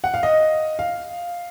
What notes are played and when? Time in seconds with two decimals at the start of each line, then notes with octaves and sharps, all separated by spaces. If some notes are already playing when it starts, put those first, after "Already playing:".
0.04 F#5
0.14 F5
0.23 D#5
0.79 F5